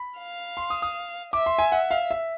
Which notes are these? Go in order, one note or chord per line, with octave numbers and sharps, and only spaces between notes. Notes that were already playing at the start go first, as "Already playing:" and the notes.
Already playing: B5
F5
C6
D#6
D#6
E5 D6
C6
G#5
F#5
F5
E5